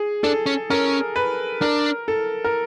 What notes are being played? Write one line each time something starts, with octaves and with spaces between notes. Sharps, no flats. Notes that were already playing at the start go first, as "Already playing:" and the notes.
Already playing: G#4
D4 A4
C#4
C#4 A#4
B4
D4 A#4
A4
A#4